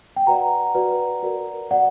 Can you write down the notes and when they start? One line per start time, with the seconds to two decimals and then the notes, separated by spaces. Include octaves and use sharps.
0.17 G5
0.27 F#4 B4 D5 F#5 A#5
0.75 F#4 B4 D5
1.23 F#4 A#4 D5
1.71 F#4 A#4 D5 F#5